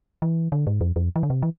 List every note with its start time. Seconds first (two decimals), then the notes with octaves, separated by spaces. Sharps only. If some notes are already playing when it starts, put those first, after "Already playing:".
0.22 E3
0.52 D3
0.67 G#2
0.81 F2
0.96 F2
1.16 E3
1.23 D3
1.30 C3
1.42 E3